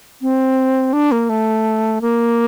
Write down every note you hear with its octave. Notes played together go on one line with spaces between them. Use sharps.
C4
D4
A#3
A3
A#3